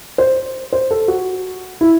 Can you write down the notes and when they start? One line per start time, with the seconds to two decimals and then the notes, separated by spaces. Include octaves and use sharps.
0.18 C5
0.73 C5
0.91 A4
1.08 F#4
1.81 E4